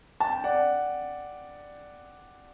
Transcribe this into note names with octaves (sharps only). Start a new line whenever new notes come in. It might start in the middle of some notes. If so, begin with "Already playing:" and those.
A5
G5
D5 F#5